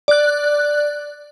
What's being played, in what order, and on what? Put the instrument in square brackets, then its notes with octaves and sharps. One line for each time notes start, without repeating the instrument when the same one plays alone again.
[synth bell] D5 F#6